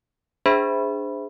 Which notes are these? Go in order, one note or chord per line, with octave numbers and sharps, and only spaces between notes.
D4 G#4 C5 E5 B5